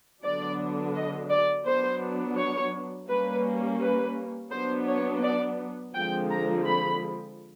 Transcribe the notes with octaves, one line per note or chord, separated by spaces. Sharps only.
D3 F#3 B3 D4 D5
D#5
D5
F#3 B3 D4 C5
C#5
G3 A#3 C#4 B4
B4
F#3 B3 D4 C5
C#5
D5
D3 F3 G#3 C4 G5
A#5
B5